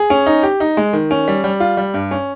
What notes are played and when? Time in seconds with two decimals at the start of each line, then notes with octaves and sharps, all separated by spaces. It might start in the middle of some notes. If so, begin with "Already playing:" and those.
Already playing: G#4
0.10 C#4
0.26 D#4
0.43 G4
0.60 D#4
0.77 G#3
0.93 D#3
1.11 C#4
1.28 G3
1.44 G3
1.60 F4
1.77 G3
1.94 G2
2.11 C#4